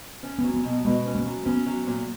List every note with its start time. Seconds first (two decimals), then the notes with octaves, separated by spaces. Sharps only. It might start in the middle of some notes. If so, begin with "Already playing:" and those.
0.23 C#4
0.38 F#3 B3
0.54 B3
0.64 B2
0.85 B2 G#3
1.06 C#4
1.15 A#3
1.26 F#3
1.45 B3 C#4
1.66 F#3
1.86 A#2